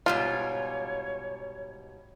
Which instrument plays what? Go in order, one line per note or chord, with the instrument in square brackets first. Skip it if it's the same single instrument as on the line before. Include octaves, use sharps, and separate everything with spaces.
[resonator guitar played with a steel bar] G#2 B2 G3 [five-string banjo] F4 [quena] C#5